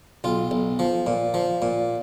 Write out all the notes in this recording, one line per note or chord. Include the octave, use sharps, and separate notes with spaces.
B1 F4
B1
F3
A#2
F3
A#2